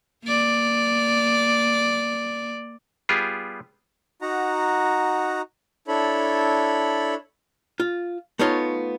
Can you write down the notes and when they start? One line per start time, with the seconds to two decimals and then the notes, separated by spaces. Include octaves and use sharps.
0.24 A#3 D5
3.09 G3 B3 F4 G4 G#4
4.22 D#4 F#4 F#5 A#5
5.88 D4 E4 A4 C#5 B5
7.80 F4
8.39 A3 B3 D#4 F4 C#5